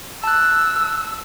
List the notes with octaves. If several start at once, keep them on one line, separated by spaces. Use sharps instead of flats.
A5 E6 F#6